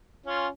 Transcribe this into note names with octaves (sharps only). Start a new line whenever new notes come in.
C#4 F4